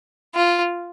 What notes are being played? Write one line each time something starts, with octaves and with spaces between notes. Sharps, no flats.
F4